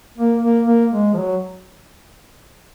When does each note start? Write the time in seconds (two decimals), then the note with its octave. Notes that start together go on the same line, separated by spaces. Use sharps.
0.18 A#3
0.42 A#3
0.67 A#3
0.92 G#3
1.14 F3
1.18 F#3